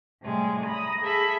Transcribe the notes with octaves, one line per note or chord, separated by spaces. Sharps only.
A2 C3 G3 G#3
A#5 B5 D#6
G#4 A4 E5 B5